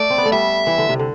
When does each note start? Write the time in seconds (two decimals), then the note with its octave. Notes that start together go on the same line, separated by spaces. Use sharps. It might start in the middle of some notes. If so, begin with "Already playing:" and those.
Already playing: A3 D5
0.10 C4
0.18 B3
0.25 A3
0.32 G3 E5
0.67 E3
0.78 D3
0.89 C3
0.99 D3